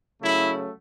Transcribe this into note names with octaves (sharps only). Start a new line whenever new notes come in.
C#3 F#3 A3 E4